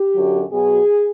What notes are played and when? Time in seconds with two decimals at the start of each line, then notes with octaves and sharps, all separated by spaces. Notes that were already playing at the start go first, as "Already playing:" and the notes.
Already playing: G4
0.15 F#2 D3 F#3
0.51 B2 F#3 G#4